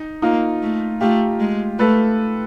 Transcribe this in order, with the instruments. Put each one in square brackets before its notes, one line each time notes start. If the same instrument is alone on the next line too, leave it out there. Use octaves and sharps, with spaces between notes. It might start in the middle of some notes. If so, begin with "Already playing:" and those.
Already playing: [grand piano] D#4
[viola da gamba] A#3 [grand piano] D#4 F4
[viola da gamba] A3
[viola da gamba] A3 [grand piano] F4 G4
[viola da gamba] G#3
[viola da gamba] A3 [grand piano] A4 B4